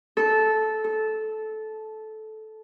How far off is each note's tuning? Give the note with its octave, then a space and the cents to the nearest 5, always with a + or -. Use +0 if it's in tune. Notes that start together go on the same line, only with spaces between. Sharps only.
A4 -15
A4 -15